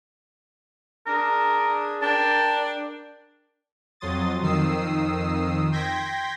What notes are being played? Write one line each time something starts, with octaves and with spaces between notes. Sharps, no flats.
D4 G#4 A#4
D4 A#4 G5 A5
F2 F#3 C6 D#6 A6
F2 D#3 D#6 E6 C7
G5 C6 G6 G#6 A#6 B6